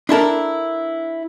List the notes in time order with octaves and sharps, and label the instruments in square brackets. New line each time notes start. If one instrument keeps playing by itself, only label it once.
[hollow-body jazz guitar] D4 E4 A4 A#4